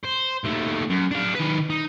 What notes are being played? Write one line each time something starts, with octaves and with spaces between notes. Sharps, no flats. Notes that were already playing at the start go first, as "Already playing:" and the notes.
C5
D#2 A3
F#2
D4 F5
D#3 B4
D#4